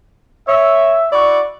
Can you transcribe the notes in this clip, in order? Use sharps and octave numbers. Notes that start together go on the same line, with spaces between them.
C#5 E5
E4 F#4 D5 C#6